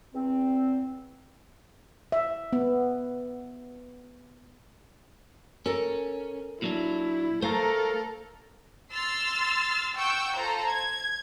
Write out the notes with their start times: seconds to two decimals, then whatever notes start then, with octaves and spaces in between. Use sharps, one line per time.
0.15 E2 C4
2.12 E5
2.53 B3
5.66 C#4 A4 A#4
6.62 A#2 F#3 D4 E4
7.42 A3 A4 A#4 C5 F5 A#5
8.91 C6 E6 F6 A6
9.97 F#5 G5 C#6 E6 G6
10.35 F4 A4 C5 A#5
10.67 G#6